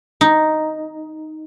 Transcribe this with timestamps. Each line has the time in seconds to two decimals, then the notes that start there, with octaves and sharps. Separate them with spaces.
0.21 D#4